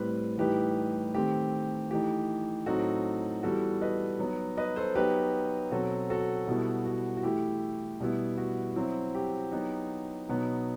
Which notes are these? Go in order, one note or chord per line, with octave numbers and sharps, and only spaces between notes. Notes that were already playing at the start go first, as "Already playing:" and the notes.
Already playing: A2 G3 C4 B4
A2 E3 G3 D#4 G4 B4
D#3 A3 C4 G4
E3 A3 D#4 G4
A2 F#3 C4 D#4 F#4 A4
E3 G3 B3 F#4 A4
B4 D#5
F#3 B3 D#4
B4 D#5
A4 C5
F#3 B3 D#4 G4 B4
B2 F#3 C4 F#4 A4
F#4 A4
B2 G3 B3 E4
F#4
F#4
E3 A3 E4 G4
B2 G3 B3 E4
F#4
F#3 C4 E4
G4
F#3 B3 D#4
B2 F#3 B3 D#4